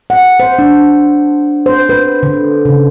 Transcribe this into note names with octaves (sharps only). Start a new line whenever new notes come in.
F#5
C5
D4
C5
B4
D3
C#3